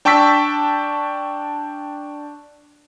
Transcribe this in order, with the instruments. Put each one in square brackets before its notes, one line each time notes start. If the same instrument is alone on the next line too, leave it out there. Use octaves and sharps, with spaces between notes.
[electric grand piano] D4 G5 A5 C#6 E6 B6